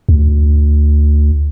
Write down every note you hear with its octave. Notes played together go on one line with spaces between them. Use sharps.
D2